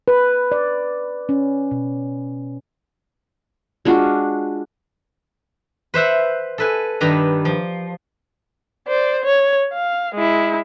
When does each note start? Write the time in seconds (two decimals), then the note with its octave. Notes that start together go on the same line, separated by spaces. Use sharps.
0.08 B4
0.52 D5
1.29 C#4
1.71 B2
3.85 G#3 D4 F4 F#4
5.94 B4 C5 E5 F#5
6.58 A4 B4 G#5
7.01 G2 D#3 B4 A#5
7.45 F3
8.88 C5 D5
9.24 C#5
9.73 F5
10.15 G#3 E4